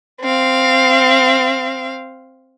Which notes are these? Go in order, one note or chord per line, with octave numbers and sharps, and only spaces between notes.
C4 F5